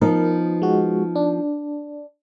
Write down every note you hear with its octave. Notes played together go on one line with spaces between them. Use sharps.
F3 B3 D#4 A#4
G#3 F#4
D4